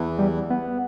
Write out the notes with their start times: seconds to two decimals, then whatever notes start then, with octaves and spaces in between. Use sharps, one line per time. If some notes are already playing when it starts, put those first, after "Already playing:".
Already playing: E2 E3
0.19 G3
0.50 B3